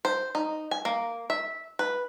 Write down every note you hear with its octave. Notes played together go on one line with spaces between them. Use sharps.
C5
D#4
G#5
A#3
E5
B4